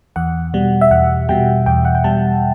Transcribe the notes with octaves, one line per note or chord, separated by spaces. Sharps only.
E2 F#5
B2 G3
E5
E2 F#5
B2 G3 G5
E2 G5
F#5
G5
B2 G3 A5